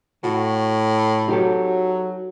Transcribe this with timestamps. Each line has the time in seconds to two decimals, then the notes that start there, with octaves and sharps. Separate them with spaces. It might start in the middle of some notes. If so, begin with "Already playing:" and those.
0.24 A2 F#4
1.28 F#3 D#4 G4 A4